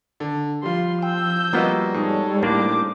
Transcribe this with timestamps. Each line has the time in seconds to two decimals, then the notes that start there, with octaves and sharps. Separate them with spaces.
0.20 D3
0.63 F3 G3 F4 C6
1.02 G5 E6 G6
1.53 F3 G3 A#3 B3 F#4 D#5
1.94 G#2 A4 C#5
2.43 A2 A#3 D4 C5 D6